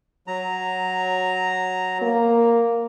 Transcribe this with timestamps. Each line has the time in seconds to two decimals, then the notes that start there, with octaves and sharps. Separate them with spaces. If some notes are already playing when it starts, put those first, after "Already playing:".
0.27 F#3 A#5
2.02 A#3